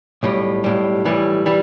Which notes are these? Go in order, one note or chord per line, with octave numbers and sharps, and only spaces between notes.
B1 A2 G3
B1 A2 G3
B1 A2 E3 G3
E3 G3